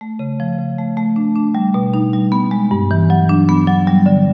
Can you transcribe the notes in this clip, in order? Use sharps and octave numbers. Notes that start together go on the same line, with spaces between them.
A3
C#3
F3
C#3
A3
A3
D4
D4
G3
B2
D#4
G3
B3
G#3
G2
E3
F#3
D4
B3
F#3
G3
D3